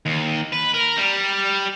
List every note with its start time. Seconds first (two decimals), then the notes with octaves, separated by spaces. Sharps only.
0.06 D#2
0.52 B4
0.74 A#4
0.97 G3